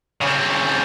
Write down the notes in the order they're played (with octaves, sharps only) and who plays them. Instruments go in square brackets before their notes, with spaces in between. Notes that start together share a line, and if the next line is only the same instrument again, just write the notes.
[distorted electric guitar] C#3 C4